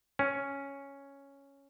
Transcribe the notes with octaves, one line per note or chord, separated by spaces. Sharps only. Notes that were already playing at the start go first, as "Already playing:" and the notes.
C#4